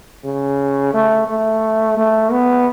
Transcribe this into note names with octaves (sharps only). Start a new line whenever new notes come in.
C#3
A3
A3
A3
B3